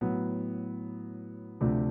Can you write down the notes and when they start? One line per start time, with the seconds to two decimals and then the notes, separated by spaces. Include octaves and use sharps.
0.01 A2 F#3 B3
1.61 D2 C3 F3 A3 D4